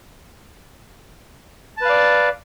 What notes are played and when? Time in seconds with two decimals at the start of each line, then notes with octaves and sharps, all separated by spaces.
1.77 A5
1.81 B4
1.85 F5
1.89 D5